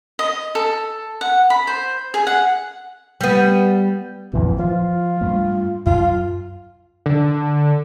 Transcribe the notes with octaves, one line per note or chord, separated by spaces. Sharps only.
D#5
A4
F#5
B5
C5
G#4
F#5
G3 B3
G#1 F2 A#2 E3
F3 F4
G2 A3
F#2 F4
D3